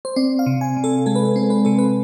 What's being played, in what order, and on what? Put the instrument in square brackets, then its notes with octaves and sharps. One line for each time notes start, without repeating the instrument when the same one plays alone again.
[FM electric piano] C5
C4 D5
F5
C3
G#5
C3
A4
G#3 A4
B4
A4
C4
B4
C3 A4
B4